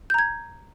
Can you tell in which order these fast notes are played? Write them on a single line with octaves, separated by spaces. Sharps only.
G6 A#5 G#6